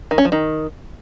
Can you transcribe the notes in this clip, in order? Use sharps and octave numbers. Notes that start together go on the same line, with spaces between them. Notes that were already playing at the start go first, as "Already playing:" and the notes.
D#3
C#4
F3
D#3